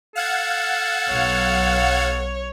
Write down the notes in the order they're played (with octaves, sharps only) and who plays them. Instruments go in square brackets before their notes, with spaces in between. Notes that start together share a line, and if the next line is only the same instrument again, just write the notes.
[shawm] A4 [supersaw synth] F5 F#5 G#6
[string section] B1 [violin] C#5